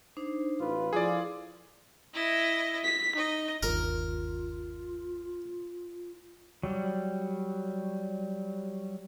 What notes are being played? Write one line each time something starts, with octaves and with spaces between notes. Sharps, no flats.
D4 D#4 C5
A1 F4 B4
F3 E4 F4 G#4 A4 D5 D6
E4 D#5
B6
D#4 D#5
G1 D#2 F4 A#4
F#3 G3